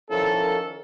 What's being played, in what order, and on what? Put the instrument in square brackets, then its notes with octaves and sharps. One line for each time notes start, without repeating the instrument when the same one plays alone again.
[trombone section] D#3 F3 C#4 E4 A4 A#4